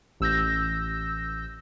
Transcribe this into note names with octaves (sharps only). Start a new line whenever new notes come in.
A1 E6 G6 A#6